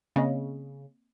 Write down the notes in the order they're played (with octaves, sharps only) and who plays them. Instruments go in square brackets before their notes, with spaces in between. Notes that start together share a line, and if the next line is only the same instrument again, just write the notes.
[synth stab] C#3 [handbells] A#3 C4 D#5